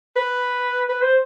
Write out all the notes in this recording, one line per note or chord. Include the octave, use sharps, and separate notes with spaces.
B4
B4
C5